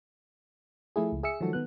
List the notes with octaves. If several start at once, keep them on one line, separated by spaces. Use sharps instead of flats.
F3 A3 E4 G#4
C#2
G#4 E5 E6 C#7
D#3 F3 F#3 G#3 F#4 A4
D#3 B3 F#6